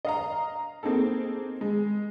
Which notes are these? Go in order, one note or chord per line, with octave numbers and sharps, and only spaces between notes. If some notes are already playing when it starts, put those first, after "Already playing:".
D#5 F5 A#5
A#3 C4 D#4 G#4 A4
G#3